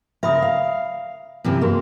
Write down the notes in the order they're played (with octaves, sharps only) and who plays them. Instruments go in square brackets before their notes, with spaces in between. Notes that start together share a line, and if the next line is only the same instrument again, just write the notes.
[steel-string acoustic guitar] C#3 A#4 [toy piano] E5 B5 D#6
[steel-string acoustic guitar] F5
F#2 C3 E3
[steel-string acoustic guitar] A#3 [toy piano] F#4 G#4 A#4